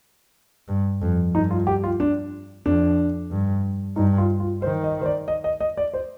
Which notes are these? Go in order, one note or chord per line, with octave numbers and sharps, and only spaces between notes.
G2
F2
G2 D#4
F4
G4
F4
D4
F2 D4
G2
G2 D#4
F4
F4
D#3 C5
D#5
C5
D5
D#5
D#5
D#5
D5
C5